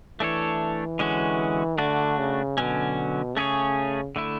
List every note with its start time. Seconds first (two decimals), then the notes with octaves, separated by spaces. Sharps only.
0.19 E3 A3 D4 A4 C#5
0.99 D3 G#3 C#4 F#4
1.78 D3 A3 D4 F#4
2.18 C#3
2.58 B2 D3 F#3 C#4
3.36 C#3 A3 C#4 G#4 C#5
4.16 D3 A3 E4